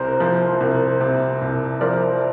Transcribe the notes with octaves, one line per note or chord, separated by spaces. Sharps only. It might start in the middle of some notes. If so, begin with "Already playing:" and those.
Already playing: C2 C3 A#4 C5
F3
C2
C3
C2
F3 A#4 D5